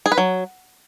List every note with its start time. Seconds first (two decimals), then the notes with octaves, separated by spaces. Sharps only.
0.06 G#4
0.12 B4
0.18 F#3